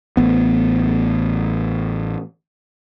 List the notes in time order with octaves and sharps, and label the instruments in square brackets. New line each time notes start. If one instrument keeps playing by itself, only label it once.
[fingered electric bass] A1 B3